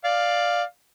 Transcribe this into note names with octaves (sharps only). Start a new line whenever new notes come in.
D5 F5